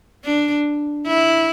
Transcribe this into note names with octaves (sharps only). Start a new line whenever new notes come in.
D4
E4